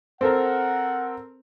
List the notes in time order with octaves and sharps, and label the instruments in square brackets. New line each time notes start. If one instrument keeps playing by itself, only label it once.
[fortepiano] C4 A4 A#4 [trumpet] F#5